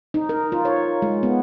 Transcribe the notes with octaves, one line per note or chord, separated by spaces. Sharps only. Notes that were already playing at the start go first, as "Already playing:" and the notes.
D#4
A#4
F4
C#5
G#3
B3